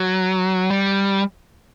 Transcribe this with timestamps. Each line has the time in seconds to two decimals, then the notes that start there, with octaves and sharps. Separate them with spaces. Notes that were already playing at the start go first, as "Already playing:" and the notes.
Already playing: F#3
0.70 G3